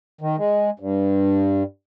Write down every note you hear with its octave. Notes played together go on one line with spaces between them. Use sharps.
D#3
G#3
G2